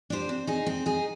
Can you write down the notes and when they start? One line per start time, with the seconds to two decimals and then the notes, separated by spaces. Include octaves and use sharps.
0.10 D4 G4 C5
0.29 C4
0.47 D#4 G#4
0.67 C4
0.86 D#4 G#4